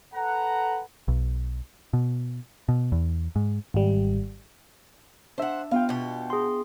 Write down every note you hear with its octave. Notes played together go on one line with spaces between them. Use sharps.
A4 B4 F#5 A#5
B1
B2
B2
E2
G#2
G#1 G3
D4 C5 E5 F#5
B3 F4 F5 G5
B2 G4
G#4 C6